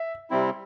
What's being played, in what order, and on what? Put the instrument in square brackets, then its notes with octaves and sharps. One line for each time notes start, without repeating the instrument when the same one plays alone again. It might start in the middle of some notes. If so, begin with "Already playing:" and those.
Already playing: [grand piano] E5
[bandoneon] C3 G3 C4 E4